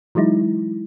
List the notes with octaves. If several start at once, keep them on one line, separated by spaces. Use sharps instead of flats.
E3 F#3 G#3 D#4 E4